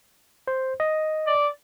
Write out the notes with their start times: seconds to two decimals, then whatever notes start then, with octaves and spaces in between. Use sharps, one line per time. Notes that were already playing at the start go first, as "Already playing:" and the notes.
0.48 C5
0.80 D#5
1.27 D5